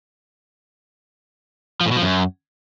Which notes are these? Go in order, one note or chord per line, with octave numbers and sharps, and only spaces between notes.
F3
A2
B2
F3
F#2